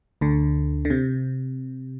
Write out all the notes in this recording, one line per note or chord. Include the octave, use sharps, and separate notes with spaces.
D2 D3
D3
C3